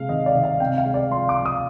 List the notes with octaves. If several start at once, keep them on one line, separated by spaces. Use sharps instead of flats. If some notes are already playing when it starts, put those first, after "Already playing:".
Already playing: C3 G#3 F5
D#3 D#5
D5
D#3
F5
C3 G5
F5
G#3
D5
F3 C6
D6
F3
D#6